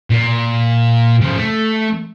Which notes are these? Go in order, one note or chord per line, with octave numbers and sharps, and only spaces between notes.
A#2
C#3 F3
A3